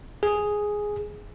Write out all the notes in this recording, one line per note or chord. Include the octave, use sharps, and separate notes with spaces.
G#4